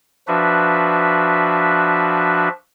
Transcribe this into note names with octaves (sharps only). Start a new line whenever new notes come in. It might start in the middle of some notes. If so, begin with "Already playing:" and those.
F3 D4 F#4 B4 E5